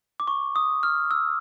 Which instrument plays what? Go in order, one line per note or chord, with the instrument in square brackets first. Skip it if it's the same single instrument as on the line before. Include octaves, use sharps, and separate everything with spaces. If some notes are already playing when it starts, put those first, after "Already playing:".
[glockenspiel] D6
C#6
D#6
F6
E6